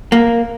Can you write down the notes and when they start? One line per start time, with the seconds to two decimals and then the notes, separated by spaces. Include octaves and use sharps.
0.12 A#3